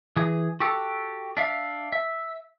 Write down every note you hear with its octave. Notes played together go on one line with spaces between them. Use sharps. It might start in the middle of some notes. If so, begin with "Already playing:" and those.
E3 G#4
F#4 G4 A4
D4 E5 F5
E5